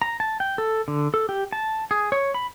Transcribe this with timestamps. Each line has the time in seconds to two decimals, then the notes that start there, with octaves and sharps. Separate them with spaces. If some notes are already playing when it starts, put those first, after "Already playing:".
0.02 A#5
0.20 A5
0.40 G5
0.58 A4
0.88 D3
1.14 A4
1.29 G4
1.53 A5
1.91 G#4
2.12 C#5
2.34 B5